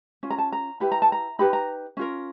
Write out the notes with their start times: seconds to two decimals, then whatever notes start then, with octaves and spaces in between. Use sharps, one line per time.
0.23 C#4 F4
0.30 A#5
0.38 A5
0.52 A#5
0.80 E4 G4 B4 B5
0.92 A#5
1.02 A5
1.12 A#5
1.39 D#4 G4 B4 B5
1.53 A#5
1.97 C#4 F4 A#4